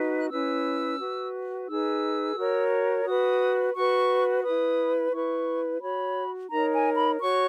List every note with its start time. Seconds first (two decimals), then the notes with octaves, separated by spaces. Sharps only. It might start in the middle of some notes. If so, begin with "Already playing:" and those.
Already playing: D#4 F#4 B4
0.19 F#6
0.30 C#4 E4 B4 E6
0.99 F#4 B4
1.68 D#4 G#4 B4 E6
2.37 F#4 A#4 C#5
3.06 F#4 B4 D#6
3.74 F#4 B4 C#6
4.43 E4 B4 D#6
5.13 E4 B4 C#6
5.81 F#4 C#5 B5
6.50 D#4 A#4 C#5 A#5
6.74 G#5
6.96 B5
7.19 F#4 C#5 C#6